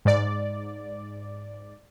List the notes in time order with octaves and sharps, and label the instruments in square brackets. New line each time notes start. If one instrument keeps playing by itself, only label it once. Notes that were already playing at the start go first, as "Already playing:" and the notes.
[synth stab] G#2 D5